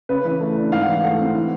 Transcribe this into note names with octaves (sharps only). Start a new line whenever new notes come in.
C#3 B4
E3
A3
D4
G#2 F5
F#5
E3 F5
A3 F#5
C4
E3